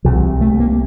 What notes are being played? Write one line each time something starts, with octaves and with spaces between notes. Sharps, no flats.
C2 C3 F3
A3
A#3